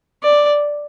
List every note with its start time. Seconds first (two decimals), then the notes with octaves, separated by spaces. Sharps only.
0.23 D5